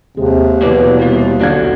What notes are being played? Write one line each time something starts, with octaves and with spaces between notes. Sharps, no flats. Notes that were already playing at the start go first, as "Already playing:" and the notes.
D#2 C3 G#3
B2 E3 F#3 A#3 B3 D5
C3 G3 F4
B1 D3 D4 F#4 F5 G#6